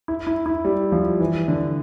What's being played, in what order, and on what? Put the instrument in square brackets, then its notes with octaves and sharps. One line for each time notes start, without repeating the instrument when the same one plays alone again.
[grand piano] E4
E4
E4
G3
F3
E3
D3